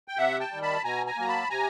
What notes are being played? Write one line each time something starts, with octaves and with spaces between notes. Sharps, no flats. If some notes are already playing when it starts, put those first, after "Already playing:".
G5
C3 E5 F#5
G5 A5
D#3 G3
A5 B5
B2 G#5 A#5
G#5 A#5
F#3 A#3 A#5
A5 B5
C3 G#5 A#5